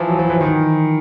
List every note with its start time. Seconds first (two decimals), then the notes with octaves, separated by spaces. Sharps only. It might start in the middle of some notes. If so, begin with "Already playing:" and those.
Already playing: E3 F3
0.08 F#3
0.19 F3
0.30 E3
0.41 D#3